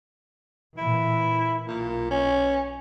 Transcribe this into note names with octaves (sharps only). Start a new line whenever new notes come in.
A#2 E3 E4
B1 A#2
C#4